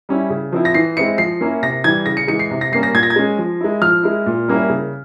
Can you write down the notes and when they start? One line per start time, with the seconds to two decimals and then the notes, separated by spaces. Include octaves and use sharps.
0.09 G3 C#4 E4
0.30 C#3
0.52 F3 C4 E4
0.65 A#6
0.74 E3 C7
0.97 G#3 C4 E4 C#7
1.18 F3 C7
1.41 A#3 C#4 E4
1.63 C3 A#6
1.84 E3 G3 G#6
2.06 C#3 A#6
2.17 C#7
2.28 E3 G#3 C#7
2.39 C7
2.51 C3
2.61 A#6
2.72 G3 A#3 C#4 C7
2.83 A#6
2.94 A#2 G#6
3.03 A#6
3.10 G#6
3.16 G#3 C#4
3.38 F3
3.61 G#3 E4
3.81 F3 F6
4.03 G#3 E4
4.26 A#2
4.48 G3 A#3 C#4 E4
4.70 C#3